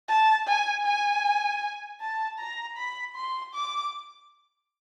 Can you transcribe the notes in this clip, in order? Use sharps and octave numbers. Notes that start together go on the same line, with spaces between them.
A5
G#5
G#5
A5
A#5
B5
C6
D6